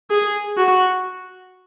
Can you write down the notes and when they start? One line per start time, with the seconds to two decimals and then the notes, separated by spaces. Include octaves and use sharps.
0.10 G#4
0.57 F#4